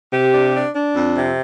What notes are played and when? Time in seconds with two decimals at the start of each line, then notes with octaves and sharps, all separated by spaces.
0.12 C3 G4
0.34 D4
0.55 D4
0.74 D4
0.96 F2
1.16 C3